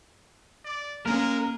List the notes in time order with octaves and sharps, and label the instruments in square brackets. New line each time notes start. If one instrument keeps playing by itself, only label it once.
[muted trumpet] D5
[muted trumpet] G#3 [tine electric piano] A#3 C#4 [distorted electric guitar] A#4